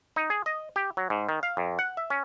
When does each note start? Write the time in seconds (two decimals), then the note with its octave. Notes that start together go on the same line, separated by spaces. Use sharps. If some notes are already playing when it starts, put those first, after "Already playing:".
0.16 D#4
0.30 G#4
0.46 D#5
0.76 G4
0.97 F#3
1.10 G#2
1.29 D#3
1.43 F5
1.57 F2
1.79 F#5
1.97 E5
2.10 C#4